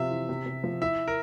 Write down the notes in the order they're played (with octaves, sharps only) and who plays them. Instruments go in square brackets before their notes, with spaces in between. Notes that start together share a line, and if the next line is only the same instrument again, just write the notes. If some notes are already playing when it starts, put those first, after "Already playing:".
Already playing: [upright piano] C3 F3 F4 [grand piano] E5
[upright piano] E3
C3
C3
F3
[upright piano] E4 [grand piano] E5
[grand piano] A#4